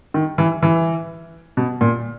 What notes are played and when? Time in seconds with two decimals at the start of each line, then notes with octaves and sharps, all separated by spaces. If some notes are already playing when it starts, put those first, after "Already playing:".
0.14 D#3
0.38 E3
0.62 E3
1.57 B2
1.81 A#2